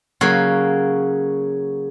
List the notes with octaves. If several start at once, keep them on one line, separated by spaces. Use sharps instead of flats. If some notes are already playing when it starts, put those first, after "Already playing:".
C#3 F#3 A#3